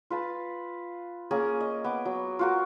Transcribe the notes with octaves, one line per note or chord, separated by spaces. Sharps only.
F4 B4 A5 B5
A#3 C#4 G#4 A#4
D#5
B3 D6
F#3
F4 F#4 A#4